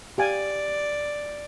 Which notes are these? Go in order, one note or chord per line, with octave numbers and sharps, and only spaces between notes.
G4 D5 F5 G#5